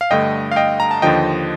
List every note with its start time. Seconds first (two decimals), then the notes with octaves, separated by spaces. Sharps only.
0.01 F5
0.11 G2 D3 A3 D#5 G5
0.51 F5
0.56 D#5 G5
0.80 A#5
0.91 A5
1.02 D#2 D3 F3 D#5 G5